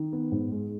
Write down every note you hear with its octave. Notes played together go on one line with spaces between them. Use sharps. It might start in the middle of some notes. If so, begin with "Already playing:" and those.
Already playing: D#3
B3
G#2
G#3